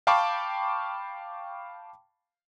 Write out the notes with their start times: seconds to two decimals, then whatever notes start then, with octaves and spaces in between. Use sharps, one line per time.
0.07 F5 G5 A5 B5 C#6 D6